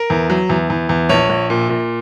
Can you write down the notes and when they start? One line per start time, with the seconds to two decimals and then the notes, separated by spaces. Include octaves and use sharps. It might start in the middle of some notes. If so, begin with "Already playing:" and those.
Already playing: A#4
0.10 E2
0.30 F#3
0.50 E2
0.70 E2
0.89 E2
1.09 A#1 C#5
1.29 A#1
1.50 A#2
1.69 A#2